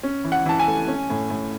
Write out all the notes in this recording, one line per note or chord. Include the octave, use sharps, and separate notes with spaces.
C#4
E3
F#5
E3 A5
G#5
A3
C#4
A2
A2